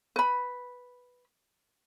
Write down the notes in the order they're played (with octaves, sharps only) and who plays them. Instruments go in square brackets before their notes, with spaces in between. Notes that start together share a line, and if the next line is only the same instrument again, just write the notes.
[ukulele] B4 B5